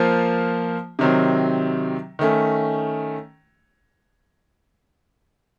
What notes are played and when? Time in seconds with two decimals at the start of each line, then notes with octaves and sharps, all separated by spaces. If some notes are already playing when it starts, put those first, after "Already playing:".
Already playing: F3 A#3 F4 C5
0.99 C3 D#3 F#3 C4
2.19 D#3 A3 C#4